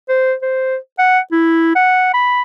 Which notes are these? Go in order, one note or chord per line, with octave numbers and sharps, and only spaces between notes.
C5
C5
F#5
E4
F#5
B5